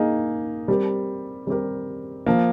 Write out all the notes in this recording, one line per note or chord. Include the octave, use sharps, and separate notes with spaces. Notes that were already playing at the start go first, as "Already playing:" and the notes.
Already playing: A#3 D#4 G#4
G3 C4 G4 A#4
G3 C4 G4 A#4
F3 A#3